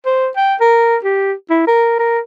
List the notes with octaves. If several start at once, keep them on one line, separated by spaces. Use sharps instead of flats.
C5
G5
A#4
G4
E4
A#4
A#4